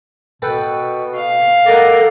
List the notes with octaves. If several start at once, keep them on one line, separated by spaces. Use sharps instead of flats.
B2 A4 B4 G5
F5
A4 A#4 D5 D#5 F#5